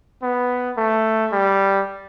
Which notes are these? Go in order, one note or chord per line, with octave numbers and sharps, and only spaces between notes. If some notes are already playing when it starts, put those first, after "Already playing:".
B3
A3
G3